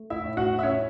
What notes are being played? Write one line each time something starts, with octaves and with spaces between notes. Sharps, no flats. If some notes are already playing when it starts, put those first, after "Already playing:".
Already playing: A3
E4 E5
A2
F#4 F#5
E5
C#4 E4 C#5